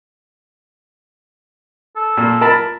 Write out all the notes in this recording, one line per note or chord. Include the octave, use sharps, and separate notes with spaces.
A4
A#2
A#4 A5 B5